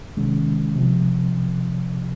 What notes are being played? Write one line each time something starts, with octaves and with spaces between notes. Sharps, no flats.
C2 C3 D#3 G#3 C#4
C2 C3 F3